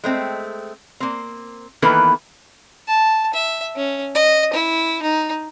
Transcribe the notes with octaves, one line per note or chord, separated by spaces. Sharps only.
G#3 A3 C4
A#3 C4
D#3 E3 A#3 B3 A4 B4
A5
E5
C#4
D#5
E4
D#4